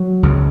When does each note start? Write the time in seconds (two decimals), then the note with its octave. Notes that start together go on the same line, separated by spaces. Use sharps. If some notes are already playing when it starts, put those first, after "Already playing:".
Already playing: F#3
0.23 C#2 C#3